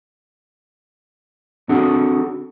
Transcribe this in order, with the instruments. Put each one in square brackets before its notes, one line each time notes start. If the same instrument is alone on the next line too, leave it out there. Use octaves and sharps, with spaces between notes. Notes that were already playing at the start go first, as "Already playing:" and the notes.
[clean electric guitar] C4 D4 F#4 G#4 A4